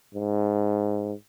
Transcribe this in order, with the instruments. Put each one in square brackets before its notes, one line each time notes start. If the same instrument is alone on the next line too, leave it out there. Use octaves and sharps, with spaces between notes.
[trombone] G#2